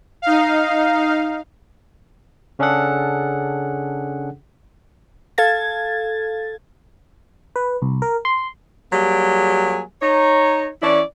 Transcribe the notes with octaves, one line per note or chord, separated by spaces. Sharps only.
D#4 F5
C#3 C#4 D4 G#4 A4 F#5
A4 F5 G#6 A6
B4
C2
A#4
C6
F#3 G3 A#3 G4 G#4
D#4 C#5
E3 C#4 E4 D5